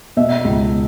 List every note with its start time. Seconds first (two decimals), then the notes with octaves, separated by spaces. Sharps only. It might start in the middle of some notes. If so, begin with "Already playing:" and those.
0.17 B2 E5
0.45 C#2